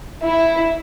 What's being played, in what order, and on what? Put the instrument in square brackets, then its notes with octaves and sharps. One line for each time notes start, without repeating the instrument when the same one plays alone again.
[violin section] E4